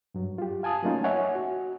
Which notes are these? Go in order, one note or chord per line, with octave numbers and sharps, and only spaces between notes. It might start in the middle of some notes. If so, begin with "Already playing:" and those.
G2 F#3
F4 G4
F5 G#5 A5 D#6
F#3 A3 A#3 C#4 D#4 F4
C#5 D#5 E5 F#5 G#5
F#4